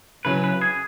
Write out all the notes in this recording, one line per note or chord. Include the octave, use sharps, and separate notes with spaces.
C#3 F#3 C#4 E4 B4
B4
G#4